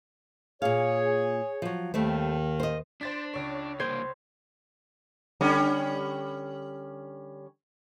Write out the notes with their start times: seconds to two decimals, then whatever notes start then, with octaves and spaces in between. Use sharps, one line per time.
0.62 A#2 G#4 C#5 F5
1.62 F3 F#3
1.94 D#2 D#3 G3 A3 C4
2.60 C5 D#5
3.01 D4 C5 A6 B6
3.34 C#2 C#5
3.80 C2 A#3 C5 G#6
5.41 D3 G3 C#4